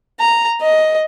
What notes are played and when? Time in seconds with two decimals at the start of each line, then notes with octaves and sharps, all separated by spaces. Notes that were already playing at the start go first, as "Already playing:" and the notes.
0.20 A#5
0.62 D#5